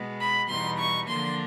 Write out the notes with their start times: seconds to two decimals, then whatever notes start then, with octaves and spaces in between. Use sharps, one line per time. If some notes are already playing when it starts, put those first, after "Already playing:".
Already playing: B2 G#3 B3
0.20 B5
0.49 E2 B2 G3 B3 D#4 C6
0.78 C#6
1.08 D3 F3 A#3 D4 C6